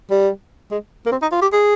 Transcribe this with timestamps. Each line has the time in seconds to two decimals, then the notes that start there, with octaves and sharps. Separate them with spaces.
0.10 G3
0.71 G#3
1.06 A#3
1.12 C4
1.22 D#4
1.32 F4
1.42 G4
1.52 G#4